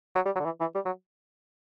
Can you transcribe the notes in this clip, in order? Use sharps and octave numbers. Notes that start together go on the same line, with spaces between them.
F#3
G3
F#3
D3
E3
E3
G3
F#3